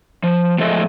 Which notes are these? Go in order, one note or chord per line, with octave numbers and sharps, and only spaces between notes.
F3
A2 F3 G#3 A4 D#5 E5